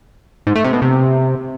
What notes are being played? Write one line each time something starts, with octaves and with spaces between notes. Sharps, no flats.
G#2
A3
C3
B2
C3